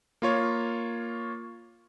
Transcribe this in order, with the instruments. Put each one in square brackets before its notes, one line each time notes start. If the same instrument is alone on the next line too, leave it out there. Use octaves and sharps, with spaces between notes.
[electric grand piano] A#3 F4 C#5